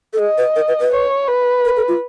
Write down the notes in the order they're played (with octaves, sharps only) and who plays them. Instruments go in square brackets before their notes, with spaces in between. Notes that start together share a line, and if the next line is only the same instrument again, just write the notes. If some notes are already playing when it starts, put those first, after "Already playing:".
[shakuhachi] A4
[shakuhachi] G#4 [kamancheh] D#5
[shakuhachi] B4
A#4
B4
B4
[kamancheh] C#5
B4
[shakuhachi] A#4
A4
F4